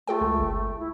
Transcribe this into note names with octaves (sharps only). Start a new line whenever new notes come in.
A3 F4 G#4 G5
C#2
G1
E4